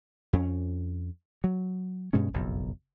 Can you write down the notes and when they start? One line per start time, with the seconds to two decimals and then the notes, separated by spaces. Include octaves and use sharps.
0.33 F2 C#4
1.44 F#3
2.13 G2 B2 G#3 C#4
2.33 F#1 B1 F2